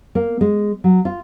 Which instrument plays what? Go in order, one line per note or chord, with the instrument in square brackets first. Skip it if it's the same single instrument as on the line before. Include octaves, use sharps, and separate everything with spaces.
[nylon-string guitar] A#3
G#3
F#3
F4